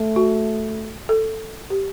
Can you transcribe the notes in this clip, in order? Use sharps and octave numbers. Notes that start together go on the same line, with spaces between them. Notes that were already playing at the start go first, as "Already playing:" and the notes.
Already playing: A3
F#4
A4
G4